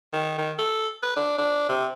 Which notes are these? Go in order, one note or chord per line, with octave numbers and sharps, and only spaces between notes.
D#3
D#3
A4
B4
D4
D4
C3